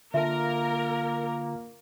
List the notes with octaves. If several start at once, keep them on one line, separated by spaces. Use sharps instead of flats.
D3 A#3 F4 A#4 E5 A5